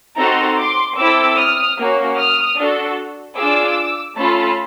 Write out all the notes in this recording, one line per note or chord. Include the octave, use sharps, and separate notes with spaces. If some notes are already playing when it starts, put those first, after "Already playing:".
C4 D#4 F#4 A4 A#5 C6
C6 D6
C4 E4 A4 D6 E6
D#6 F6
A#3 C#4 F#4
D#6 F6
D4 F#4 A4
D4 F4 G#4 D6 E6
A3 C#4 F4 A4 A5 B5